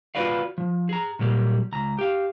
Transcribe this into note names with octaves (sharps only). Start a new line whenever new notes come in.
F4 F#4 B4 D5 F5
F3
G#4 A#5
A#2 F#3 G3 A#3
C#2 A#5
G4 F5